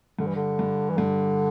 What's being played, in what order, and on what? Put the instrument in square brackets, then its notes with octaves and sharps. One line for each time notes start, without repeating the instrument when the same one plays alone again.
[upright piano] G2 [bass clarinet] D3
[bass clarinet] E3
D3
[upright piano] G2
[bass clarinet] E3
[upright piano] G2 [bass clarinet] D3